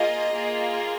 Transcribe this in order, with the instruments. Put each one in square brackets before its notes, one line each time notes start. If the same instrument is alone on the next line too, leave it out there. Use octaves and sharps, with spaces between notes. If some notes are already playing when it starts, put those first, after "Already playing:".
Already playing: [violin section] A#3 F4 G#4 D#5
A#3 F4 G#4